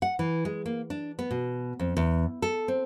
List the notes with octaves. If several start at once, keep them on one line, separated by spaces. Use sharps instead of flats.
F#5
E3
G#3
A#3
D4
B3
B2
F2
E2
A4
C4